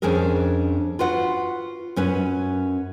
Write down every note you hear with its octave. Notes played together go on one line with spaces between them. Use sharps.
F2 C#4 D4 G#4 A#4
F4 F#4 B4 F#5
F#2 C#4 B4